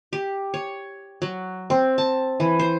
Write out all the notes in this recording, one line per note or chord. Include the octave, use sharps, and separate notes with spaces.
G4
C#5
F#3
C4
A5
E3
C5